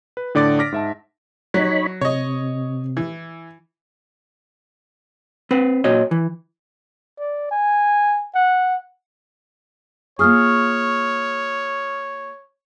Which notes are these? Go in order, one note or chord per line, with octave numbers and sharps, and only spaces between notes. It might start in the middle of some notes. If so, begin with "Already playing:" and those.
B4
A2 D3 D5 D6 A6
D6 F6 A#6 B6 D7
G#2 E5 A5
F#3 D#4 C#5 B5
C3 C#5 D#5
E3
C4 B4
A#2 F#4 C#5 D#5
E3
D5
G#5
F#5
A#3 F4 G#4 C#5 C#6 D#6 F6